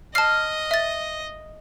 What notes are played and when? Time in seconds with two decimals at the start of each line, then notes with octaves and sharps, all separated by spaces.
0.15 D#5 A5 F6 C7
0.71 E5 A6